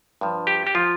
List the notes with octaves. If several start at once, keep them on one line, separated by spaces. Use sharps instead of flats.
G2 F3
G4
G4
F3 F4